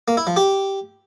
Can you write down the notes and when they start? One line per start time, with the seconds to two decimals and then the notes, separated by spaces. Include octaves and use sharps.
0.08 A#3
0.17 E4
0.27 F3
0.36 G4